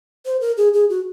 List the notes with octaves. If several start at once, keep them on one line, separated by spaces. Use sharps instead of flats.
C5
A#4
G#4
G#4
F#4